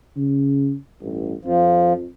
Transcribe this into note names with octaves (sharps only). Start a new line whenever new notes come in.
C#3
A1 G2
F2 F3